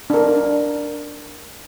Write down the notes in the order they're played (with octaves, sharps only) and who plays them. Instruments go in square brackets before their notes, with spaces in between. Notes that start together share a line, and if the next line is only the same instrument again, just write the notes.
[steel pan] D4 A#4